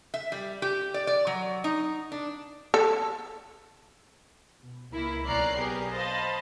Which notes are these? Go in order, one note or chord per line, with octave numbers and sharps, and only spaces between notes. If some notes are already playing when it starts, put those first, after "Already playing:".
E5
G3
G4
D5
D5
F#3
D#4
D4
A4
B2
C#2 A#3 E4
B1 C#4 D5 A#5 F#6 C7
B3 G4 G#4 A#4
C5 D#5 F5 A5 B5 A6